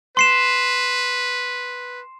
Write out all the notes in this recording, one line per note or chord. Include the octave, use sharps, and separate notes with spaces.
B4 C6 C7 E7